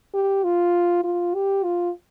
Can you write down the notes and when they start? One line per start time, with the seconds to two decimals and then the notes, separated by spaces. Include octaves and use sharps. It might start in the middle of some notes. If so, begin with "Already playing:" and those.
0.14 G4
0.44 F4
1.04 F4
1.34 G4
1.64 F4